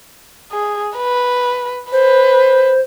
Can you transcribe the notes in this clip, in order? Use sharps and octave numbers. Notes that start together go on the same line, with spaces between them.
G#4
B4
B4 C5